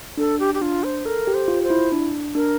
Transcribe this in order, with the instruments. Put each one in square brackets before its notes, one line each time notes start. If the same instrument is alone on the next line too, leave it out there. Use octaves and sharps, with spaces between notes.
[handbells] D4 [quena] A4
[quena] G4
G4
[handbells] D4 [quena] F4
[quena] C5
[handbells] A4 [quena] A#4
[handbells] G4
[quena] C5
[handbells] F4
[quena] C5
[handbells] E4
D4
[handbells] D4 [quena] A#4